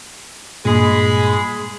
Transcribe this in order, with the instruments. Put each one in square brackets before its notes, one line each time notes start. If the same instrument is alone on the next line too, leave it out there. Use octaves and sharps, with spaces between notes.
[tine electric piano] G2 A#2 [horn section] G#3 G#4 B5